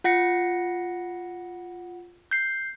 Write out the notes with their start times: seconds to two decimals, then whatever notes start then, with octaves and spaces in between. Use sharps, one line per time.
0.04 F4 F#5 A#6 C#7
2.31 G6 C7